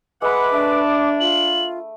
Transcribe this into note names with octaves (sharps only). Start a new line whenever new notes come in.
G#3 B4 E5 F#5 B5 D6
A3 D4
F4 F#7